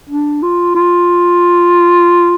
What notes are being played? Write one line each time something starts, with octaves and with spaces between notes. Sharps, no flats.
D4
F4
F4